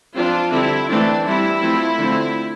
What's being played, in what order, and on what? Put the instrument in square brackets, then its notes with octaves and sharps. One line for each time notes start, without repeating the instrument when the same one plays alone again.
[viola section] F3 C4 D4 F4
D3 G3 C4 E4
E3 A3 C4 D4
E3 G3 C4 E4
F3 A3 C4
D3 F3 A3 C4